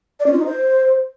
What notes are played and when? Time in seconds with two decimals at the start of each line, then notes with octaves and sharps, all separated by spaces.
0.20 D5
0.26 C#4
0.33 F4
0.39 D#4
0.46 C5